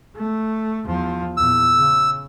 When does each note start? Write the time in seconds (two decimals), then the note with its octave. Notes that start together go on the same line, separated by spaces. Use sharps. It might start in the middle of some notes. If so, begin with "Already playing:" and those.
0.16 A3
0.85 E2 F3
1.37 E2 A#2 E6
1.76 C#3